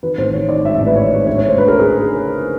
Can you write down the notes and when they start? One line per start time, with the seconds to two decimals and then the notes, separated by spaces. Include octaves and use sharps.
0.03 D#3 B4
0.18 A1 C5
0.34 D#3 C#5
0.49 D#3 D5
0.64 G#2 E5
0.75 E5
0.80 A1
0.86 B4
0.95 D#3 C#5
1.11 G#2 C#5
1.27 D2 C#5
1.38 C#5
1.43 D2 C5
1.58 D2 B4
1.68 A#4
1.74 C#3
1.79 G#4